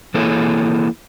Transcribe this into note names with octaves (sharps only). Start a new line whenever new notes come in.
E3 A#3 E4 G#4 A4 C#5